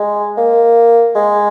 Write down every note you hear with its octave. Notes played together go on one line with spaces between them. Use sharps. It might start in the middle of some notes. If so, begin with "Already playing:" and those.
Already playing: G#3
A#3
G#3